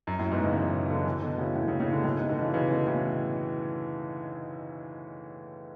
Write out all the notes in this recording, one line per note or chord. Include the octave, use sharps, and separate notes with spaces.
F#2
F#2 A2
G#2 B2
A2 C#3
C#3 E3
C#3
B2 D3
C#3 E3
B2 D3
A2 C#3
A2 C#3
A2 C#3
A2 C#3
B2 D3
A2 C#3
G#2 B2
B2 D3
C#3 E3
C#3 E3
B2 D3
A2 C#3